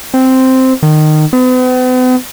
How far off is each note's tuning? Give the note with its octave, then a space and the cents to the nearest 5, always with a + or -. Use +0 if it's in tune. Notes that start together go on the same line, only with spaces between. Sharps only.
C4 -5
D#3 -20
B3 +45